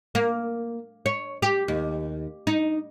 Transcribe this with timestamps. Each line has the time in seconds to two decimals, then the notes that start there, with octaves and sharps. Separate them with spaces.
0.15 A#3
1.06 C#5
1.42 G4
1.68 D#2
2.47 D#4